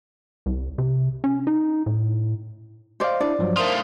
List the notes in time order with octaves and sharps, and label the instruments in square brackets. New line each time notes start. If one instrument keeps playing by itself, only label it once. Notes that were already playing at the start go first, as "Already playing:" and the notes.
[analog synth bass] C2
C3
C#4
D#4
A2
[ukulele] C5 D5 [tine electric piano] D#5 F5
[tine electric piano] D4 E4 [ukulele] D5
[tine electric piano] G2 F3 F#3
[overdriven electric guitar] A3 F4 [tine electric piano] A#4 C5 D#6